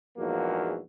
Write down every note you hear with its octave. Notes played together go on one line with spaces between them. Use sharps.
A#1 E2 G#2 F3 A#3 F#4